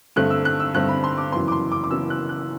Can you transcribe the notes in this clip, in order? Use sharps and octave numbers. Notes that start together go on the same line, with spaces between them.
G2 D3 A3 C4 F#6
E6
F#6
E6
G2 D3 A3 C4 F#6
B5
C6
D6
F#1 F#2 E3 B3 C6
D6
C6
D6
D6
F#1 F#2 E3 B3 E6
F#6
F#6